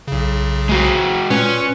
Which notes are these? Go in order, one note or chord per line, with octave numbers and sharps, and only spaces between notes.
B1 C#3
G#3 F#4
A#2 C#4 B4